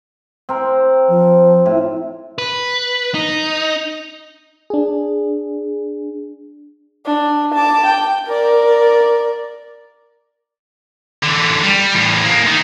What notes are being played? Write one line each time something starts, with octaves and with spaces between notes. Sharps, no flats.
C4 A#4
F3
A2
B4
D#4
D4 G#4
D4
A5 D6
G5
A#4 D5
D3 E3
G3
E2 A2
A#3 G#4
D#3 D#4